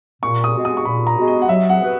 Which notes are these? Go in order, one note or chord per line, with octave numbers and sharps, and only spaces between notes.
A#2 C#6
D#6
G#3 B3 F#4
D#6
C#6
A#2 B5
A#5
G#3 B3 F#4
D#5
F#5
F#3 E5
F#5
B3 F#4 B4